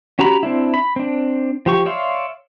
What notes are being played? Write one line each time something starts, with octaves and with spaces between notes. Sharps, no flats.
C#4 F#4 G4 A#5 B5
C4 D4 E4
B5
C4 D4
F3 G4 C#6
C#5 D5 E5 F5 C6